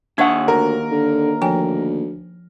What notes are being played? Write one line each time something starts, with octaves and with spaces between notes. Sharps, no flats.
D#2 D4 E5 F#5 C#6
D2 A#4
D3
D2 F3 G5 G#5